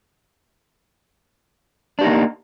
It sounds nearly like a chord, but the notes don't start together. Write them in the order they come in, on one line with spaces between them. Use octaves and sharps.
D4 G4 D#4 A#3